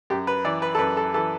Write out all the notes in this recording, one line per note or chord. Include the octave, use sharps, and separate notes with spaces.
F#2 G4
B4
E3 D5
B4
A4
F#2 B4
A4
E3 A4